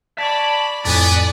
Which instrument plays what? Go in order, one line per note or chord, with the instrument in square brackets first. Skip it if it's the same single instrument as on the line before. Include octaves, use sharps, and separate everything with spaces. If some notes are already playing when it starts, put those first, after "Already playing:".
[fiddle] D5 B5 [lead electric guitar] A5 [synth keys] C#6 G#6 B6
[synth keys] F2 A2 [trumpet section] B3 [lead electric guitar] D5 [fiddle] G#5